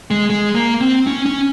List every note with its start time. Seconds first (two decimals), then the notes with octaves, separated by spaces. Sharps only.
0.11 G#3
0.30 G#3
0.55 A#3
0.81 C4
1.07 C#4
1.26 C#4